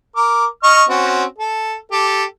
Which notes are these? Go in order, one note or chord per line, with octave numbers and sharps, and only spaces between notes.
A#4 D6
D#5 C#6 F6
C4 C#4 F#4
A4
G4 A4